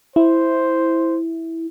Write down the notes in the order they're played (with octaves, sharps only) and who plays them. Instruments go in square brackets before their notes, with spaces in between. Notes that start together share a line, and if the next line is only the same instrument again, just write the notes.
[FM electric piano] E4 [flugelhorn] C5